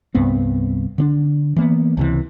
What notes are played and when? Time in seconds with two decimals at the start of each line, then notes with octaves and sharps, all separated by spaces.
0.15 C2 G2 B3 C4
0.98 D3 C4 D4
1.56 E3 A#3 B3
1.97 C#2 C3 E3